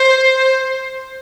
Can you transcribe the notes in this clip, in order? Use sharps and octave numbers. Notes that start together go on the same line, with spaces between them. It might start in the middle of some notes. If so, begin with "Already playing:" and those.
Already playing: C5